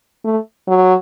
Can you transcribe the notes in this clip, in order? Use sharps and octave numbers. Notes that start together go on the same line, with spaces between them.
A3
F#3